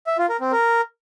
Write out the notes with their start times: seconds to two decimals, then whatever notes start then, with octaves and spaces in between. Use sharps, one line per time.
0.07 E5
0.18 F4
0.29 A#4
0.41 C4
0.52 A#4